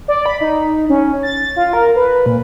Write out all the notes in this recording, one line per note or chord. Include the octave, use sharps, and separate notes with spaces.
D5
B5
D#4
C#4
A6
F4
A#4
B4
A#2